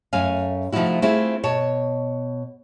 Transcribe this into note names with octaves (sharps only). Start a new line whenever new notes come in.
F#2 A3 F5 G#5
C3 F3 A3 D#4 E4 F#4
A3 C4 E4 F4 G#4
B2 C#5 A5